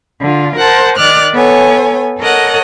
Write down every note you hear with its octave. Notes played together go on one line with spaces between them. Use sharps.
D3 F4
A#4 C5 F#5 A5
D#3 D5 F6 F#6
B3 A4 C#5 G#5
A4 A#4 C#5 D#5 F#5